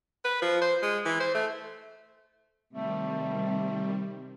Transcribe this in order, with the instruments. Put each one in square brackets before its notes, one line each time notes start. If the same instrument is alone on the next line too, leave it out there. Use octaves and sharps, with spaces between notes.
[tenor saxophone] B4
F3
C5
G#3
E3
C5
A3
[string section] C3 D#3 [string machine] G3 [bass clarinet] A3